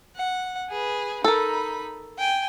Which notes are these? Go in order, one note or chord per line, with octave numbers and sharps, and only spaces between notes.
F#5
G#4 B4
D#4 A4 A#4 B5
G5 G#5